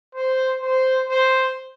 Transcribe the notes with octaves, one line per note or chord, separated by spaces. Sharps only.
C5
C5
C5